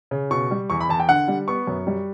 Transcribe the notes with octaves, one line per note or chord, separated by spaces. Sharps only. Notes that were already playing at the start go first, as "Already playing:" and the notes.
C#3
B2 C#6
G3
E2 C#6
B5
E2 A5
G5
D3 F#5
G3
B3 C#6
F#2
G3